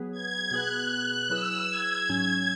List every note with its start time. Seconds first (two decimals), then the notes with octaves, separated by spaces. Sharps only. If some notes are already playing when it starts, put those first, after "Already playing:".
Already playing: F#3 B3 G#4 B4
0.12 G#6
0.51 B2 B3 G#4 B4 F#6
0.90 F#6
1.30 F#3 E4 G#4 B4 E6
1.69 G#6
2.09 G#2 F#3 C#4